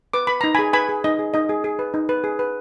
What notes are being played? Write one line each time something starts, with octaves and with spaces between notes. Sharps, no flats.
B4 D6
B4 B5
D#4 A#5
G#4 G#5 B5
B4 G#5 B5
G#4
D#4 D#5
G#4
D#4 D#5
G#4
G#4
B4
D#4
B4
G#4
B4